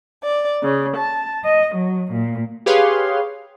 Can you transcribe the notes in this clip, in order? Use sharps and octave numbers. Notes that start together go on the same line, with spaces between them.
D5
C#3
A5
D#5
F#3
A#2
G4 G#4 B4 C#5 F5 C6